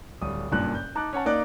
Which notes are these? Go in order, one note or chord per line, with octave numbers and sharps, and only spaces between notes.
D1 G3 D#6
F#1 G2 A#2 F#6
G6
D#4 A5 D6 F#6
C#4 C#5 F#5 A5
A#3 D#4 D5 F#6